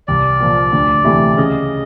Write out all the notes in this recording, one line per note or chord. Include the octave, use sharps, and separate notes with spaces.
C2 D5
A#2 F3
D2
C3 E3 A3
C#3 D#5